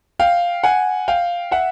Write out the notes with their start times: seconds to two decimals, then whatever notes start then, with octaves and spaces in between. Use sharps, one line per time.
0.19 F5 G5
0.64 F#5 G#5
1.08 F5 G5
1.51 E5 F#5